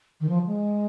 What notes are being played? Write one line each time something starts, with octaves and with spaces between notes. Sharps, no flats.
D#3
F3
G#3